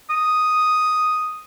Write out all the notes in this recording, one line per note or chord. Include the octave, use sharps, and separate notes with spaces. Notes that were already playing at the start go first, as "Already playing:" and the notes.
D#6